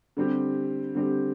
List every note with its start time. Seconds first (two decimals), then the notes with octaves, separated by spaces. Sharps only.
0.17 D3 G3 C4 G4
0.95 D3 G3 C4 G4